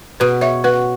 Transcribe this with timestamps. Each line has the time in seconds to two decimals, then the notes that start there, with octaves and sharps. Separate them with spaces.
0.20 B2 B4
0.41 C#5 E5
0.64 F#4 B4